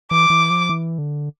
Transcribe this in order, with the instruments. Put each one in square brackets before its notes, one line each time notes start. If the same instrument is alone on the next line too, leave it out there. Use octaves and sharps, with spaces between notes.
[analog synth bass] E3 [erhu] D6
[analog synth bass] E3
F3
E3
D3